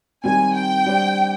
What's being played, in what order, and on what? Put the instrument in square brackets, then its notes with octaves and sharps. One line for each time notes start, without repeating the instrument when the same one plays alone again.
[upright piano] D#3 G3 C4 [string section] G#5
[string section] G5
[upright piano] G3 D4 G4 C5